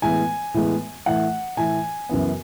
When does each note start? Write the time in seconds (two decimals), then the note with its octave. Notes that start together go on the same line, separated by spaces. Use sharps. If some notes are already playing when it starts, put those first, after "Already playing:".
0.02 A2 E3 G#3 B3 G#5
0.54 A2 E3 G#3 B3
1.06 A2 E3 A3 F#5
1.57 A2 E3 A3 G#5
2.09 F#2 C#3 E3 B3